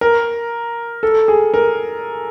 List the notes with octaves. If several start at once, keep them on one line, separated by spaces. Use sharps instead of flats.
A#4
A4
G#4
A#4